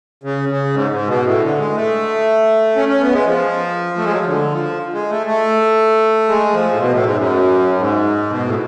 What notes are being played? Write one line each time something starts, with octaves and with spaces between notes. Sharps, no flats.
C#3
C#3
G#2
G#2
B2
A2
D3
G#3
A3
C#4
C#4
B3
G#3
F3
A3
G#3
F#3
F3
D3
F3
G#3
A3
A3
G#3
F3
A2
B2
A2
G#2
F#2
G#2
B2
A2